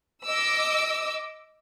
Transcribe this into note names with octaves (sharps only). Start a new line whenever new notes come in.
D#5 D6 E6